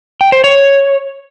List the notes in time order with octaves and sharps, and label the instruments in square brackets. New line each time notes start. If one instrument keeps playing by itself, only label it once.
[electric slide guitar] G5
C5
C#5